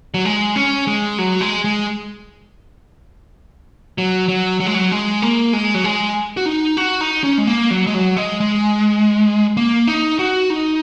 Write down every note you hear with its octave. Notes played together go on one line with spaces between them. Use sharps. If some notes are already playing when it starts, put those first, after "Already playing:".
F#3
G#3
C#4
G#3
F#3
G#3
G#3
F#3
F#3
F#3
G#3
F#3
G#3
A#3
G#3
F#3
G#3
F#4
D#4
F#4
D#4
C#4
G#3
A#3
F#3
G#3
F#3
G#3
G#3
A#3
D#4
F#4
D#4